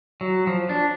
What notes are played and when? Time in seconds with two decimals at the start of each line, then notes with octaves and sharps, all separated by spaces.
0.21 F#3
0.47 F3
0.69 D4